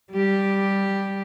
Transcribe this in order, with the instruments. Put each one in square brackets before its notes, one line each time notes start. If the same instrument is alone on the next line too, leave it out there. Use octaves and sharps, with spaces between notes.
[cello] G3 G4